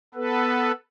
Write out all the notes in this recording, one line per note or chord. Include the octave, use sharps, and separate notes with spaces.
B3 A4 B4